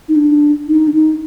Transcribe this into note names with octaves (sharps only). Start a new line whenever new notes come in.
D#4
D4
D#4
D4
D#4